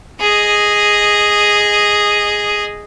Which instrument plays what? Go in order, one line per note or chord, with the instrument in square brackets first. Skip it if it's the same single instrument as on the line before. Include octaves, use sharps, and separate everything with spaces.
[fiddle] G#4 D#5